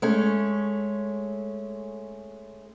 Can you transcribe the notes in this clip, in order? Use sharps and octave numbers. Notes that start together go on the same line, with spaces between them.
G#3 A3 C#4